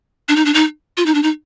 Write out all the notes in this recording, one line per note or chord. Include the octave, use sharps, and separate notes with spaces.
D4
D#4
D4
D#4
F4
D#4
D4
D#4